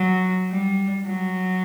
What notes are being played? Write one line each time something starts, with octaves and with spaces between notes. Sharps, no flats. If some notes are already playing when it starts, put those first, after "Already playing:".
Already playing: F#3
G3
F#3